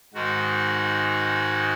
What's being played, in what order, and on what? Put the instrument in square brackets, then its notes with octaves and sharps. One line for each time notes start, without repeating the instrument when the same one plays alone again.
[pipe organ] G#2 D#3 G#3 F#4